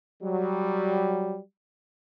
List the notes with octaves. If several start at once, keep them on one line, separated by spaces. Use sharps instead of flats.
F#3 G3